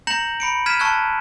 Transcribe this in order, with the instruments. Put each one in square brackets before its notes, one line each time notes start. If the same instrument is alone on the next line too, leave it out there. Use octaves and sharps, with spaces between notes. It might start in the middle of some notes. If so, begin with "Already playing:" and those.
[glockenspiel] A#5 G6 A#6 C#7 F#7
B5 C#7 D7
F6 G#6 B6 D#7 E7
A5 C#6 E6 F#6 G#6